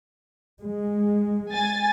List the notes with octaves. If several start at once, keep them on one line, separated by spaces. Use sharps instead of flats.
G#3
G#5 A6